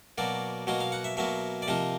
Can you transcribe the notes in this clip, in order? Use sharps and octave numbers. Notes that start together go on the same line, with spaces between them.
B2 F#3 A#3 D5
B2 F#3 A#3 D#5
F5
F#5
E5
B2 F#3 A#3 E5
D5
C3 F3 A#3 D#5